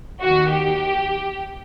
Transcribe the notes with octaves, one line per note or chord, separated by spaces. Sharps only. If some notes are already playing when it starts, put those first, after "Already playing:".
D#2 D#3 F#4
G4